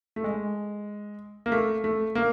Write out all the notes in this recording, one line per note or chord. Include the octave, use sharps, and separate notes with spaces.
A3
G#3
A#3
A3
A3
A#3